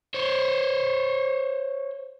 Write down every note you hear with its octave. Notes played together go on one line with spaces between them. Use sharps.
C5 C#5